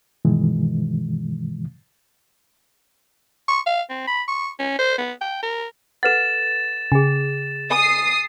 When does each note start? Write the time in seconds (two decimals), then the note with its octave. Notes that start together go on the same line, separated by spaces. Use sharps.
0.25 G2 B2 D#3 E3 G#3
3.48 C#6
3.66 F5
3.90 C4
4.07 B5
4.28 C#6
4.59 C#4
4.79 C5
4.98 B3
5.21 G5
5.43 A#4
6.03 A4 B4 F#5 A6 E7
6.92 C#3 G#4 G5
7.71 G#5 D#6 C7